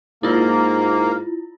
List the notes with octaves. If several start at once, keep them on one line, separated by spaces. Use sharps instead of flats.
G#2 A#3 E4 F4